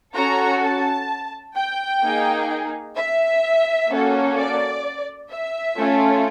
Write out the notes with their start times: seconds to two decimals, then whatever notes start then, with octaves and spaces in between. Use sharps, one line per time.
0.15 C#4 F#4 A4 A#5
0.62 A5
1.55 G5
2.03 A#3 D#4 G#4
2.96 E5
3.89 A#3 C#4 F#4 A4
4.36 D5
5.30 E5
5.77 A3 C#4 F4 A4